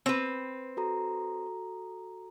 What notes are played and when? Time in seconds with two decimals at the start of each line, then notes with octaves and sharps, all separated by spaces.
0.06 C4 B4
0.77 F#4 A4 A#5